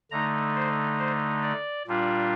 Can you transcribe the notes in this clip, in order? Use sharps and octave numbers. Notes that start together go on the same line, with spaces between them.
D3 A3 D#4 A#5
C5
C5
D5
A#2 G3 D4 F4